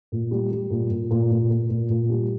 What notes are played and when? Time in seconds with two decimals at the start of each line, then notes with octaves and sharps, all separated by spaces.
0.12 A#2
0.31 G3
0.51 G3
0.70 A#2
0.91 A#2
1.11 A#2
1.31 A#2
1.51 A#2
1.69 A#2
1.89 A#2
2.10 G3